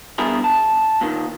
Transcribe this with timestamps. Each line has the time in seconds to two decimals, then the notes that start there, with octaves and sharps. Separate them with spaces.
0.18 G2 B2 E4 G#4 A#4
0.44 A5
1.01 A#2 D#3